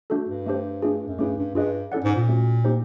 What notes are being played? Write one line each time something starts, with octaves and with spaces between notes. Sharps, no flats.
A3 D4 F#4 A4
G2
A3 D4 G4 C5
A3 D4 F4 G#4
F#2
G2 A3 C#4 E4 G#4
G2
G2 F4 G#4 B4 D#5
C#4 E4 A4 D5 F#5
G#2
A#2
A3 C#4 F#4
A#3 D#4 G4 C5